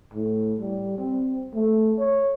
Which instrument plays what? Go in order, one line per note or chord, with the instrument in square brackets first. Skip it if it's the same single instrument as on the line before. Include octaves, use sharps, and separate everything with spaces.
[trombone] A2
G3
C4
A3
C#5